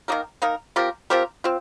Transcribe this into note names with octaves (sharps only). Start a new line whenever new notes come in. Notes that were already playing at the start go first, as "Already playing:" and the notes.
D#3 A#3 D#4 A#4
D#3 A#3 D#4 A#4
F3 C4 G4 A#4
F3 C4 G4 A#4
C4 F4